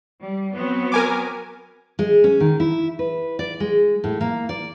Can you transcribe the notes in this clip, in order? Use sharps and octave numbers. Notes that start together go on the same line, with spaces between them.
G3
F#3 B3 C4
A#4 G#5 D6
G#3
C#4
D#3
E4
B4
D5
G#3
A2
A#3
D5